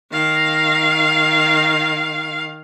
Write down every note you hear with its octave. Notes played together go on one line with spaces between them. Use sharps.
D#3 F5